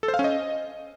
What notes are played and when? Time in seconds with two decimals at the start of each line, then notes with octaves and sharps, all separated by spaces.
0.03 A4
0.08 C5
0.14 F5
0.19 C#4
0.24 D#5